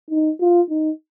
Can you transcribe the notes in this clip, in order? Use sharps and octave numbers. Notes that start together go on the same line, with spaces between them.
D#4
F4
D#4